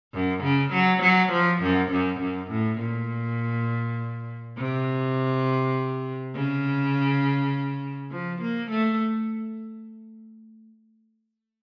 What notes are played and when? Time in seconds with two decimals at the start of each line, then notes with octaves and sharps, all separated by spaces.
0.13 F#2
0.43 C#3
0.73 F#3
1.02 F#3
1.32 F3
1.62 F#2
1.92 F#2
2.20 F#2
2.51 A2
2.79 A#2
4.57 C3
6.35 C#3
8.11 F3
8.41 A#3
8.70 A3